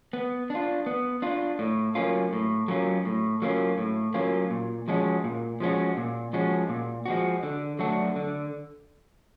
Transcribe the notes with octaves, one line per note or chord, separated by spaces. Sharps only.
B3
D4 F4
B3
D4 F4
A2
F#3 A#3 C#4 F4
A2
F#3 A#3 C#4 F4
A2
F#3 A#3 C#4 F4
A2
F#3 A#3 C#4 F4
A#2
F3 G#3 C#4 F#4
A#2
F3 G#3 C#4 F#4
A#2
F3 G#3 C#4 F#4
A#2
F3 G#3 C#4 F#4
D3
F#3 A3 D4 F#4
D3